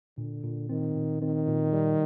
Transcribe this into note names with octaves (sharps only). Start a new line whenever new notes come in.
A#2 D3
A#2
D#3 C4
A#2
D#3 C4
A#2
G3